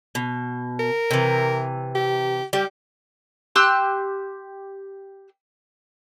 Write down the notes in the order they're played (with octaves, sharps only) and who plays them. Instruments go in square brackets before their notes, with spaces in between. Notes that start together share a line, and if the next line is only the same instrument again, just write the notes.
[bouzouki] B2
[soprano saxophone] A#4
[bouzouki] C3 E3
[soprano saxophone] G4
[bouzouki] G3 [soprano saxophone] G4
[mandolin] G4 C6 E6 F#6